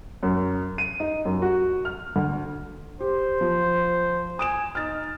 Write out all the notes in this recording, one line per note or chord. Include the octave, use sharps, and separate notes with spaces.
F#2
D#7
D#4
F#2
F#4
F6
D2
G4 C5
F3
G#5 D#6 D7 E7
D#4 F6 A6